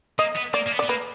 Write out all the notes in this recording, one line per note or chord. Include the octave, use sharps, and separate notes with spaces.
A#3 D#5
B3
A#3 D5
A#3
B3
D5
B3
A#3 B4